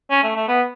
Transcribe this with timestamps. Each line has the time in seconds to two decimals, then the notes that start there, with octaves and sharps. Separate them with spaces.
0.11 C#4
0.23 A3
0.35 A3
0.48 B3